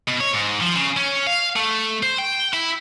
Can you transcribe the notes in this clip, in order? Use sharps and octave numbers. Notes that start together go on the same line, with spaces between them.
B2
C#5
G#2
F3
C#3
C#4
F5
A3
C5
G5
E4